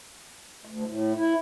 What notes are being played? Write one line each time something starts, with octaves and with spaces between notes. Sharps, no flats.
D2
A2
E4